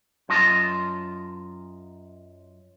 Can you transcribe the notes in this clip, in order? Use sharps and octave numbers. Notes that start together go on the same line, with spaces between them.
F#2 F4 D#5 A5